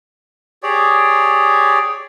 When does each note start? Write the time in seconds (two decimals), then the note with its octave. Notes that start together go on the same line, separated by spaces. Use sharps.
0.63 G4 G#4 C#5 D5